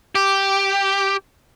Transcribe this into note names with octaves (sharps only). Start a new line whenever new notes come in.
G4